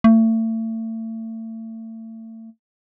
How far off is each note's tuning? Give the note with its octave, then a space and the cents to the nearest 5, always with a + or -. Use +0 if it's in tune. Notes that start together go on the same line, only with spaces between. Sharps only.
A3 +35